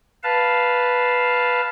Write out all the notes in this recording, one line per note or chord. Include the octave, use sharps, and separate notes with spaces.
B4 F5 A5